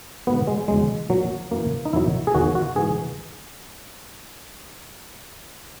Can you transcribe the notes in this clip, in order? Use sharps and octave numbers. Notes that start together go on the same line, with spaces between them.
G#2 F#3 B3
G#3
E2 C#3 F#3 G#3
A#2 F#3
F#2 E3 A#3
D#4
E2 D#3 F#3 E4
G#4
E2 D#3 F#3 F#4
F#4
G#2 E3 G#4